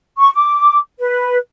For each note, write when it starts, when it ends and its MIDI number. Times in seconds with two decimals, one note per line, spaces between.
0.18 0.30 85
0.34 0.78 86
0.99 1.37 71